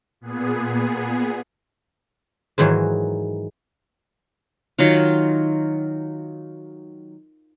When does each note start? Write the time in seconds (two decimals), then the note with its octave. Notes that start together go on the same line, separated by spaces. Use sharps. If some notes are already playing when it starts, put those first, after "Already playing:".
0.21 A#2 B3 G#4
2.58 G#2 D#3 E3 F#3 G#4 A#4
4.79 D#3 F#3 F4